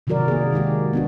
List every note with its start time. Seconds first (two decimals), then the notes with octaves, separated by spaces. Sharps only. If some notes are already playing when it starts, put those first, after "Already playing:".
0.07 C3 D#3 F#3 F#4 A#4 D5
0.28 A#3 G#4
0.52 D#3 G#3 F#4 G4
0.93 B3 D4 F#4